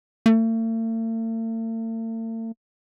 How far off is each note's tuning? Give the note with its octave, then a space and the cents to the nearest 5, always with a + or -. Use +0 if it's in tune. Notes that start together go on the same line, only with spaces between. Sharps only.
A3 +45